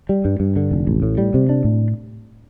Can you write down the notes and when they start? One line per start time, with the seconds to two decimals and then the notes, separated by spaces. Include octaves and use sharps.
0.09 G3
0.25 G2
0.40 G2
0.56 D3
0.71 F1
0.87 A1
1.03 A2
1.18 G3
1.34 C3
1.49 D4
1.64 A2